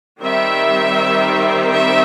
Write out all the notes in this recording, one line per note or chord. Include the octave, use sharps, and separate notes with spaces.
D#3 G3 C4 E5
E5